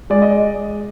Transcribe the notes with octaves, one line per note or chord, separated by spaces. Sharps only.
G#3 D5
D#5